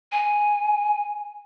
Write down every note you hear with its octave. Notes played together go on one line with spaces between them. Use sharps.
G#5